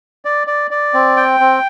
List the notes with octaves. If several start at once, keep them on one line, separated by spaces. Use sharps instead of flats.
D5
D5
D5
C4
G5
C4